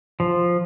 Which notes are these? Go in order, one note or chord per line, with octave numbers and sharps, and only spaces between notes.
F3